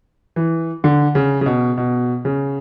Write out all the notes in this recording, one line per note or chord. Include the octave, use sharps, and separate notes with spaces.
E3
D3
C#3
C#3
B2
B2
C#3